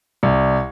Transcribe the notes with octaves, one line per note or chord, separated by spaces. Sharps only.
C2